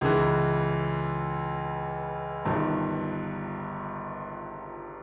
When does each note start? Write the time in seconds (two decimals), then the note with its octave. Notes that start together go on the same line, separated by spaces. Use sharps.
0.01 C#2 C#3 E3
2.45 G1 G2 D#3